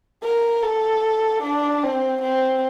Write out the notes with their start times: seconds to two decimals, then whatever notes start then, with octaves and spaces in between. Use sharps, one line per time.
0.23 A#4
0.63 A4
1.43 D4
1.83 C4
2.22 C4